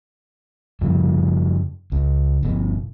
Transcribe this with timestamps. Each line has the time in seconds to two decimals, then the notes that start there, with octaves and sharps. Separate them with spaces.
0.81 F#2 C#3 F3 G3
1.92 C#2
2.43 G1 B2